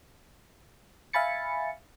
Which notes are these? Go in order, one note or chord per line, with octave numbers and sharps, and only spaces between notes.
E5 F5 G#5 B5 A6 C#7